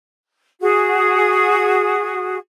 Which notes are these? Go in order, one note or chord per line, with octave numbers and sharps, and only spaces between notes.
F#4 G#4